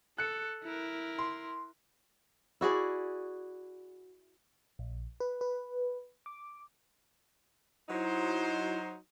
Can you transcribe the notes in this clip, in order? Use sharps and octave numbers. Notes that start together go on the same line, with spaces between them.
A4 F#6 C#7
E4 A#4
C6
E4 F#4 G#4 D5
A#1
B4
B4
D6
F#3 D#4 E4 C5